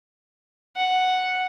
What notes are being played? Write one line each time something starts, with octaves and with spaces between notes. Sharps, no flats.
F#5